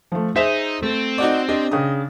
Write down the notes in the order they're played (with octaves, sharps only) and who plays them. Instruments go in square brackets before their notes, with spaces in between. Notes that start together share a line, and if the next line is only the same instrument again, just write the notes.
[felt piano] F3 A3
[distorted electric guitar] D#4 [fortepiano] G#4 C5 E5 [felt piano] B6 E7
[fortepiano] A3 [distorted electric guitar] C4
[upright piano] D#4 F#4 D5
[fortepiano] D4 [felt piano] G4 [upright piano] D#5
[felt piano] C#3 G5 D#6